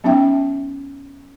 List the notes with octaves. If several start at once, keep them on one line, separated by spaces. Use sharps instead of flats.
F#3 B3 C#4 D#4 E5 G5